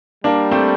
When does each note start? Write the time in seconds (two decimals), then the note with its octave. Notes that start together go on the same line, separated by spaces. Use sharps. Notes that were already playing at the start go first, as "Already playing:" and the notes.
0.24 G3 A#3 D4
0.51 A3 C4